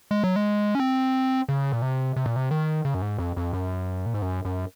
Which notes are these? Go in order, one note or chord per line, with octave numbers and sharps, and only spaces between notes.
G#3
F#3
G#3
C#4
C4
C#3
A#2
C3
C3
A#2
C3
D#3
C#3
F#2
G#2
F2
F2
F#2
A#2
G#2
F#2
F#2